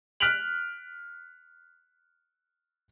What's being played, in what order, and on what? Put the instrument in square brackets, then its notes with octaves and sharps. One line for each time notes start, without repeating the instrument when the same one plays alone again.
[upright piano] F6 F#6 B6 D7 F7 F#7